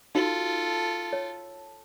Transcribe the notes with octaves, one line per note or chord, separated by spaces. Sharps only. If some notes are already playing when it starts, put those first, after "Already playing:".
D#4 F4 F#4 A4 F5
C#5